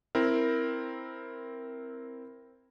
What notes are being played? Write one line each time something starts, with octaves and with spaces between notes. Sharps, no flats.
C4 E4 A#4